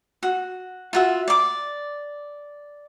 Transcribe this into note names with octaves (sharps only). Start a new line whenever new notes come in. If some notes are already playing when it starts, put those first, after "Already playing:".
F#4
F4 F#4 E5
D5 D6